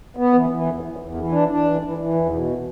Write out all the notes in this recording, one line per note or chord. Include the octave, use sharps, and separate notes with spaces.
B3
E3
E3
E2
E2
E2
E3
D4
D4
E3
E3
E3
E2
B2